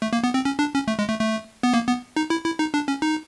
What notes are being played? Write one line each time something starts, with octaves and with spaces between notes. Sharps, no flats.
A3
A#3
B3
C4
C#4
D4
C#4
A3
G#3
A3
A3
B3
A#3
B3
D#4
E4
E4
D#4
D4
C#4
D#4